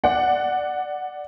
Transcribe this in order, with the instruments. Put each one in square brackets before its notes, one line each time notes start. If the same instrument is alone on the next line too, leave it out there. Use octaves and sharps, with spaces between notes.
[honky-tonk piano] D5 F#5